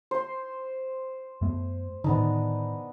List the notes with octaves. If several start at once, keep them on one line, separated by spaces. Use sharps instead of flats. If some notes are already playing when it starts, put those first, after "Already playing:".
C5 C6
F#2 A3 B3
A2 D3 D#3 B3 D4 D#4